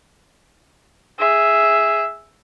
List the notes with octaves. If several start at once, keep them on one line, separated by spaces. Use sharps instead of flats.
G#4 E5